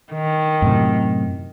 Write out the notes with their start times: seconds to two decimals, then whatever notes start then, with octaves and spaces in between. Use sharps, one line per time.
0.13 D#3
0.62 F#2 A2 C3